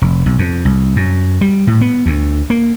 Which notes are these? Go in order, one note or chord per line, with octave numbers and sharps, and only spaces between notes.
F1
B1
F2
C2
F#2
G3
A2
B3
D2
A#3